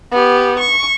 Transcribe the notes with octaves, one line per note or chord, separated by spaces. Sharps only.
B3 G4
C#6